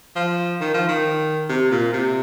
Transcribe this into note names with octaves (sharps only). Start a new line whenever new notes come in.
F3
D#3
F3
D#3
C3
A#2
C3